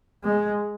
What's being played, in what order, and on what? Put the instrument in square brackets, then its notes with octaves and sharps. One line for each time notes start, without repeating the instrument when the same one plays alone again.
[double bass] G#3